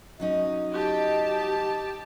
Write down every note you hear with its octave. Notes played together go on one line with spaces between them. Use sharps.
F#3 C#4 D#4 D#5
G4 A5